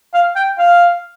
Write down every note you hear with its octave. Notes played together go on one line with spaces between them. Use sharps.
F5
G5
F5